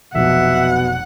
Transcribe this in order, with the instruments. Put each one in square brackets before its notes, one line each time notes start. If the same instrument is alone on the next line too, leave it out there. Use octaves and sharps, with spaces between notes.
[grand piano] F1 B1 F2 [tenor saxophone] B2 [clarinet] E5 [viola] F#5